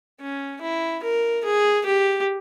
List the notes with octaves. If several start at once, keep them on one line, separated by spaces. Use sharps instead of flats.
C#4
E4
A#4
G#4
G4